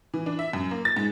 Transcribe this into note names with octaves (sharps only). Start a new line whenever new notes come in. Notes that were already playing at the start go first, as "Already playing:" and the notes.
E3
D4
E5
F#2
A#3
A6
G#2